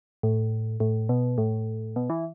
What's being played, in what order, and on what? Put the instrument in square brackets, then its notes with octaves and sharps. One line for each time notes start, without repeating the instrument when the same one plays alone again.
[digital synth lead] A2
A2
B2
A2
B2
E3